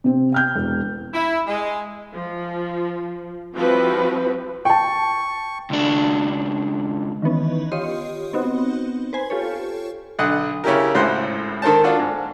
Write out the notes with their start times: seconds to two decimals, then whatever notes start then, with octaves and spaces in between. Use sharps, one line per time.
0.04 C3 C4
0.32 G5 F6 G6
0.55 E1
1.13 E4
1.47 G#3
2.14 F3
3.55 F3 G3 C4 E4 F#4 B4
4.65 G5 A5 C#6
5.70 C#2 D4
7.22 D#3 E3 B3 C#4
7.72 F4 G4 C#5 D#5 C6
8.33 B3 C4 D#4 F#4
9.13 B4 C5 G#5
9.30 F4 G4 A4 C#5
10.19 B1 D3 D#5 F#5
10.64 C#3 C#4 E4 G4 A#4
10.94 G#1 C#2 A2 C5 F#5 C6
11.62 D#3 A4 A#4 C5 A5
11.84 D4 F4 F#4 A4
11.99 G#2